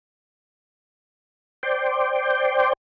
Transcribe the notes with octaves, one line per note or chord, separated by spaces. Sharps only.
C5 D5 G5